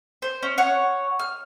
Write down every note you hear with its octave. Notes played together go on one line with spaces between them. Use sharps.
C5
C#4
C#5 F#5
F6